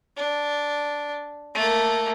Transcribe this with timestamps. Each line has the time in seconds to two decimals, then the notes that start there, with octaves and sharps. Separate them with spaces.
0.17 D4
1.55 A3 A#3